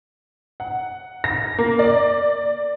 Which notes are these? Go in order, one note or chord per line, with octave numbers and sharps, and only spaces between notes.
F#5
A#6
A#3
D5